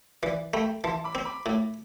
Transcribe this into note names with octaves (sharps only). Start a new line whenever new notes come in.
E3 B4 D5
A3 G5 B5
E3 A5 C6
B5 D6
C4
B5 D6
A2